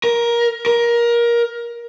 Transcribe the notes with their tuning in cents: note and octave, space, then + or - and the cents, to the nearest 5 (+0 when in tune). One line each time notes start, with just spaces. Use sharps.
A#4 +15
A#4 +20